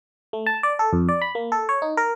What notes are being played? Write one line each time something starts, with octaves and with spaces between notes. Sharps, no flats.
A3
A5
D5
A4
F2
D5
B5
A#3
A4
C#5
D#4
A#4